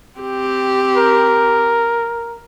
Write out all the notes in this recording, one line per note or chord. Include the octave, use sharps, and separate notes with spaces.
C4 G4
A#4